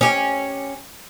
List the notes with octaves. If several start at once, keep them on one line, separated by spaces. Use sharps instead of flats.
C#4 G4